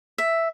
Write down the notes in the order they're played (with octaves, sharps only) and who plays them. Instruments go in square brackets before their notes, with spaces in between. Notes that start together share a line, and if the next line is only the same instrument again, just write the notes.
[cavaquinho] E5